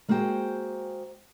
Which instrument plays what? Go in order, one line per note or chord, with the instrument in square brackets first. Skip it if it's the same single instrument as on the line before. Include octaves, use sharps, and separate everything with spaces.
[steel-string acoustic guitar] G#3 A#3 F#4 G#4 C5 G5